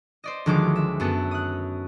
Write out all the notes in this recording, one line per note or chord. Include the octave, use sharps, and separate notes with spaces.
C5 D5 D#5
D2 D#3 F3 F#3 G#3 D6
E5
F#2 B3 A4 C#7
D#6 F#6